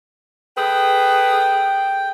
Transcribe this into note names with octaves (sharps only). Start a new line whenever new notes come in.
G#4 A4 B4 G5